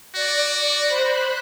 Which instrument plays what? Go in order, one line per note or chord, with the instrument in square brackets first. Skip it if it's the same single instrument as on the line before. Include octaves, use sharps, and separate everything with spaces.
[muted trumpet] F#4 [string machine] D5
[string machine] C5 B5 F#6